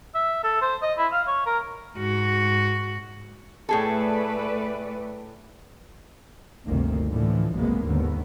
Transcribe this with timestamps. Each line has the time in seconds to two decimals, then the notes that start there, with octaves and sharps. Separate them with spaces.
0.15 E5
0.43 A4
0.62 C5
0.82 D#5
0.98 E4
1.12 F5
1.27 C#5
1.46 A#4
1.97 G#2 F#4
3.69 A2 A3 G#4 A4 B4 D5
6.67 G1 D2 C3 D#3 A#3
7.11 A2 D3 E3 F3
7.53 F#1 B1 C3 G#3 A#3 B3
7.85 D#2 G#2 D3 B3